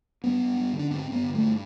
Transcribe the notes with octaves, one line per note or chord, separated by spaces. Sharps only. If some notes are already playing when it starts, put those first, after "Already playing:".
G2 B3
G2
G2
D3
D4
G2 C4
G2
B3
D3
A3
G2